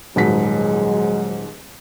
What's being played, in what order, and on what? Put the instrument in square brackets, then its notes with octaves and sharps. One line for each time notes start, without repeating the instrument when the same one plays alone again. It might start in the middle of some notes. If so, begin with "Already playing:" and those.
[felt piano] D#1 G#2 B6 [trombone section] F#3 G#3